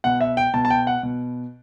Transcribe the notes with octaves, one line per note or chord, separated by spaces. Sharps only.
B2 F#5
E5
G5
B2 A5
A5
G5
F#5
B2